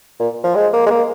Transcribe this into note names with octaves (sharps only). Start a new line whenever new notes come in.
A#2
F3
G#3
A#3
G#3
A#3